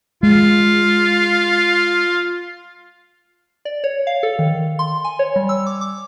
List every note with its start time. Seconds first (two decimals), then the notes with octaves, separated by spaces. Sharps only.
0.23 G#3 F4
3.65 D5
3.84 C#5
4.07 F5
4.23 A4
4.39 D#3
4.79 C6
5.05 G#5
5.19 C#5
5.36 G3
5.49 E6
5.66 D6
5.81 D6